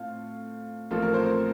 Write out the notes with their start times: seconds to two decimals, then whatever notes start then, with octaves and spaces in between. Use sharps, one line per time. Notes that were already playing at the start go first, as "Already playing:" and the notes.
Already playing: A2 A3 C4 F4 F5
0.91 A1 A2 F3 A#3 F4 A4
1.02 A#4
1.14 C4 C5
1.26 A#4